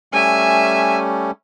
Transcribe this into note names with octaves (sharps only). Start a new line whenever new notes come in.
G3 A3 C#4 E5 G#5